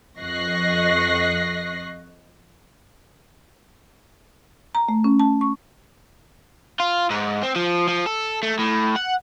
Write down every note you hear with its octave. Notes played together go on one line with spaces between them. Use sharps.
F2 D#5 C#6 F#6 A#6 C7
A#5
A3
C#4
A5
C#6
F4
G#2
C4
F3
F3
A4
A3
A2
F#5